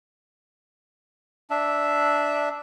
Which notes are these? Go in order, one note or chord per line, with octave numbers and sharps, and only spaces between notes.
D4 E5